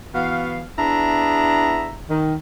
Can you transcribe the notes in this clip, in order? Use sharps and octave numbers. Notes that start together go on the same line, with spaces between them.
E3 B3 F#4 F5
B3 D4 E4 G#4 E5 A#5
D#3